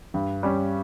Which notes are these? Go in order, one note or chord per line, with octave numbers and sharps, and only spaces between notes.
G2
G3 C#4